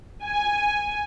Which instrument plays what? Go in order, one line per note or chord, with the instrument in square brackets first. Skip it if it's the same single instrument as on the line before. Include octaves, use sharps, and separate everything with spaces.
[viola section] G#5